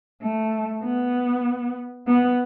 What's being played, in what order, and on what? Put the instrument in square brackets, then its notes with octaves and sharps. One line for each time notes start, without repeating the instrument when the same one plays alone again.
[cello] A3
B3
B3